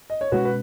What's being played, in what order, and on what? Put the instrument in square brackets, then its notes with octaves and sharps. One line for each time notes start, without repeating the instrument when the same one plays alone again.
[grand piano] D#5
C#5
[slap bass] B2 G#3 C#4 [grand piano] F#4 B4
[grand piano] B4